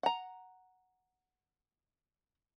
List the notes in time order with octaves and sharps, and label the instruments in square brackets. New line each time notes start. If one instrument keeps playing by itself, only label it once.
[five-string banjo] F#5 A#5